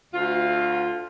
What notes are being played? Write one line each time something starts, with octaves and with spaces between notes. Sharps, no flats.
D2 F4